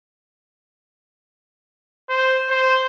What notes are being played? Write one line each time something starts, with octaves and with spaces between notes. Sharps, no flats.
C5
C5